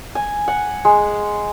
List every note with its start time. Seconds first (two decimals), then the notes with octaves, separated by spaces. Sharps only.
0.15 G#5
0.48 F#5
0.85 G#3